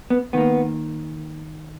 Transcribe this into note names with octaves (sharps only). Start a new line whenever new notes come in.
B3
D#3 A#3 B3